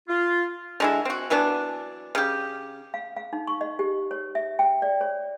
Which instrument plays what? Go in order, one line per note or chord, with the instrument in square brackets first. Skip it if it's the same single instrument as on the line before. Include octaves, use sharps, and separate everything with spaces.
[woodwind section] F4
[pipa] D3 G#3 E4
C4 F#4
E3 F#3 B3 D4
C#3 G4
[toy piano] F5
F5
D#4
C#6
D#5
G4
C#5
E5
G5
D5
C#5